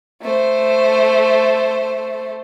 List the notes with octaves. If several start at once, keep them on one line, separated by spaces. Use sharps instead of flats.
A3 C5